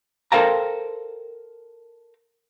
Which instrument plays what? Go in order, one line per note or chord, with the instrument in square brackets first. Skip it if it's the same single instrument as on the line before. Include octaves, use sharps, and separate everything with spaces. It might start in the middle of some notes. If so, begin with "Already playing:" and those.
[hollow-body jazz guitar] A4 A#4 C5 F5 G5 A#5